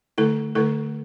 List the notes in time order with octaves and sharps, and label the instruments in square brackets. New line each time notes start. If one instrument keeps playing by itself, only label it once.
[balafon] D3 A3 E4 A4
D3 A3 E4 A4